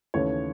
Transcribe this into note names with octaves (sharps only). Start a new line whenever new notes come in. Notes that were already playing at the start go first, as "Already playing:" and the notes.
D#2 C#3 E3 A3 C#4 C#5